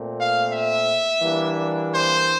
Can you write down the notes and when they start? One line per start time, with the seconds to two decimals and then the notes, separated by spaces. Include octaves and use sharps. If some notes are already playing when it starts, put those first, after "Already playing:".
Already playing: A#2 A3 C4
0.18 F5
0.53 E5
1.22 E3 G3 A#3 D4
1.92 C5